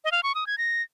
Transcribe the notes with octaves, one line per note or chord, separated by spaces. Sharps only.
D#5
F5
C#6
D#6
G#6
A#6